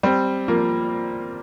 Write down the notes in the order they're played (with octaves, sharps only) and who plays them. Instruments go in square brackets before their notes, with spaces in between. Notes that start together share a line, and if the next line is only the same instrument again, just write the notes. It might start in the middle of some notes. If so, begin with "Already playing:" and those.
[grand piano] G3 C4
F3 A#3